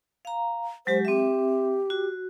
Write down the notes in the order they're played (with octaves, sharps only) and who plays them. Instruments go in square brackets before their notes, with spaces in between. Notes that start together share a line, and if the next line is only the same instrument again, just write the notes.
[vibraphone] F5 A#5
[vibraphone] F#3 G#3 G4 [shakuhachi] C5
[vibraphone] C4 E5 [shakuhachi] G4
[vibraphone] F#4